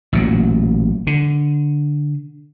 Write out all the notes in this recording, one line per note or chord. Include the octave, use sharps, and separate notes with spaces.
A1 A#2 F#3
D3